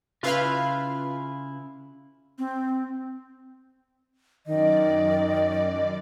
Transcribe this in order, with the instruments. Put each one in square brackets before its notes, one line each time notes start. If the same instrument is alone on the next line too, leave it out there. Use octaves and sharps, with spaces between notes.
[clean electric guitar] C#3 E4 [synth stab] F4 B4 F5
[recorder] C4
[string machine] F#2 D5 [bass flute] D#3 [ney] D#5